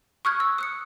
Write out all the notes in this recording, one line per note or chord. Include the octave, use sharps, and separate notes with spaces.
C#6 D#6 F6 F#6 G#6
E6
D#6 F#6 C#7